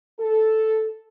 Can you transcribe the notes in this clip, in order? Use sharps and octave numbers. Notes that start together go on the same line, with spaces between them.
A4